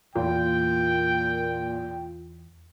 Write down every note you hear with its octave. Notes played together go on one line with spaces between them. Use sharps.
E2 A#2 F4 G5